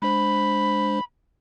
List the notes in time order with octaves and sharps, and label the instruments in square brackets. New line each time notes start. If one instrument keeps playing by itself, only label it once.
[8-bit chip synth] G#3 D4 C5 [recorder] B5